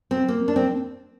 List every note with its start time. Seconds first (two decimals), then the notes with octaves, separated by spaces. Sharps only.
0.11 C4
0.28 A#3
0.48 D4
0.56 C4